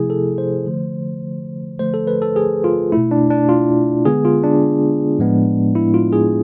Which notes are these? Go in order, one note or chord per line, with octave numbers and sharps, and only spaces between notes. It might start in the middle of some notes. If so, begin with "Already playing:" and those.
Already playing: C3 F3 A3 E4 G#4
A4
C5
D3 F3 A3
D3 F3 A3 C5
A4
B4
A4
G#4
F4
B2 A3 E4
D4
D4
F4
D3 G#3 B3 G#4
F4
D4
A2 F3 G#3 B3
E4
F4
G#4